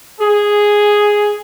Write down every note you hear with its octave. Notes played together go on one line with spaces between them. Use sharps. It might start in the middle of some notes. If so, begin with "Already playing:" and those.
G#4